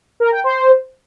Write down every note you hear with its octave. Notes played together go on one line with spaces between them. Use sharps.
A#4
G5
C5